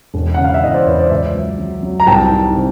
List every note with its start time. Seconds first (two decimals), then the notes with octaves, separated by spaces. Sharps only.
0.14 E1
0.34 C#3 F#5
0.44 F5
0.54 E5
0.62 E2 D#5
0.74 C5 D5
0.86 E2 B4 C#5
0.98 C5 D5
1.10 C#2 D5 E5
1.35 F#3
1.59 F#3
1.83 F#3
2.00 A#5
2.07 C2 G5 A5
2.31 D#3
2.56 C3